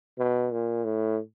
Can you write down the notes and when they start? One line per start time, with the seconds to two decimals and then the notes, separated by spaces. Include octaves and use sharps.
0.19 B2
0.52 A#2
0.84 A2